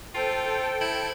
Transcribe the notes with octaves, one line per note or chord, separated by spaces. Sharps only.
F4 A4 C5 G5
E4